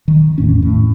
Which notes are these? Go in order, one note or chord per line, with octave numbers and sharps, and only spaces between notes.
D#3
E2 A2 C#4
A2